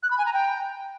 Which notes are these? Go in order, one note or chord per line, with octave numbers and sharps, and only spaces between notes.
F#6
B5
G#5
A#5
G5